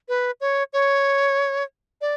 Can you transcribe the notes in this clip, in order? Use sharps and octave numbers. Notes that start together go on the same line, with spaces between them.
B4
C#5
C#5
D5